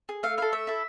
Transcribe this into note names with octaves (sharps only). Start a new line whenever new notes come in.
G#4
A3 F5
E4 A4 F5
A3 E5
E4 A4